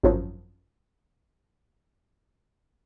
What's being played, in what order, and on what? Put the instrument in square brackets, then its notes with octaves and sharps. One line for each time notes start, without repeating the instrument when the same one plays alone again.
[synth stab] G#1 F#2 F3 F#3